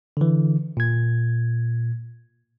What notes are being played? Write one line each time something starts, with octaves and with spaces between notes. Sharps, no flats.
D3 E3
A#2 G#6